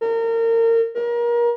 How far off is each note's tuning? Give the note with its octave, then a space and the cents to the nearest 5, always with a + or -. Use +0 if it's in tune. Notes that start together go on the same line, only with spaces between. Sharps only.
A#4 -30
A#4 +30